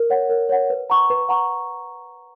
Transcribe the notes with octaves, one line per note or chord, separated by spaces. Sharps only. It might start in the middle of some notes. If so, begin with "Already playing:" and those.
Already playing: A#4
C#5 F#5
A#4
C#5 F#5
B4
F#5 A#5 C#6
B4
F#5 A#5 C#6